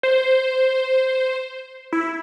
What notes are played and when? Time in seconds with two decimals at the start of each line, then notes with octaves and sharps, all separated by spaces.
0.03 C5
1.93 E4